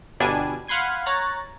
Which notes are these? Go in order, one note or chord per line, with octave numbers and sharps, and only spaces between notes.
G1 B2 G3 D4 G#5
F5 F#5 B5 C6 G#6 D#7
C#5 A#5 F#6 A6